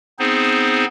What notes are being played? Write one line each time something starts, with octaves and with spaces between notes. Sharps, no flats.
B3 C4 D#4 G#4 C5